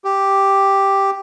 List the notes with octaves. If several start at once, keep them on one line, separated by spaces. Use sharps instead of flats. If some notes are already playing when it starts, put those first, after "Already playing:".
G4